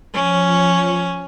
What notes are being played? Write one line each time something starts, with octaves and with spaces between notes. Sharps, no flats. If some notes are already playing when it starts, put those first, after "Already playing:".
F3 C#4 C#5